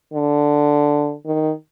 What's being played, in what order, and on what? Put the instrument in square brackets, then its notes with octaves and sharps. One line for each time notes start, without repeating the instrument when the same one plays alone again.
[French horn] D3
D#3